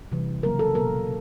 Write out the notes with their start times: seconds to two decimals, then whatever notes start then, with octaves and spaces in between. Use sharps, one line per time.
0.12 C3 E3 G3
0.43 C#3 F#3 A#3 A#4
0.59 A4
0.75 B2 F#3 A#3 A#4